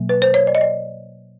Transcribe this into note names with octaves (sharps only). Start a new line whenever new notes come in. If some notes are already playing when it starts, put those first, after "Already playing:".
Already playing: B2 F#3 A#3
B4
C5
C#5
D5
D#5
D5